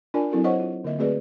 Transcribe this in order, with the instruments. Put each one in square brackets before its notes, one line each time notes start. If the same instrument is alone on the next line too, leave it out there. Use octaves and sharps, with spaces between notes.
[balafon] D4 F4 A#4 D5 G#5 A5
F#3 C4 E4 F#4 A4 A#4
C5 C#5 D#5 F#5 C#6
F4
D3 A#3 D#5 E5
A3 C4 F#4 G#4 B4 D5